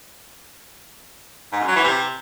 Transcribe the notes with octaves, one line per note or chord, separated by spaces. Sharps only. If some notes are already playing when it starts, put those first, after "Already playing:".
G#2
F#2
F#3
E3
C3